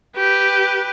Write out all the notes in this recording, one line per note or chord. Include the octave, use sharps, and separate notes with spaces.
G4 B4